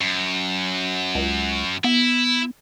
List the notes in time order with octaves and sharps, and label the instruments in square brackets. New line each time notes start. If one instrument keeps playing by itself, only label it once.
[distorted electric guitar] F#2
[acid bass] C#2
[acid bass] B3 [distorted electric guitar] E4